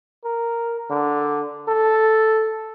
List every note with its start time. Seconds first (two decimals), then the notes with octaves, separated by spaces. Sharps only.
0.24 A#4
0.90 D3
1.68 A4